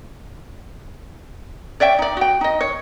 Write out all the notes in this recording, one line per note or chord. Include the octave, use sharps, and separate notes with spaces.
C#5 D5 E5 G5
D#4 D5
F#4 G5
D#4 D#5
C#5